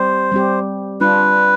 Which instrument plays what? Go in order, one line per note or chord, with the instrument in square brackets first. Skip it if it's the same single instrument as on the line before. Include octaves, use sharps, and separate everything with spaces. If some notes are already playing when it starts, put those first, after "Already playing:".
Already playing: [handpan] G3 C4 G4 [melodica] C5
[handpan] G3 C4 G4
[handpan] G3 D4 F4 [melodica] B4